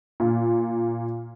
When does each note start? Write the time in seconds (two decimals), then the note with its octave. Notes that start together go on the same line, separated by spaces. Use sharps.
0.20 A#2